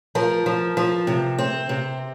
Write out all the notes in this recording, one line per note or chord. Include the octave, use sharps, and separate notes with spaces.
F3 A#4
F3
F3
C3
C4
C3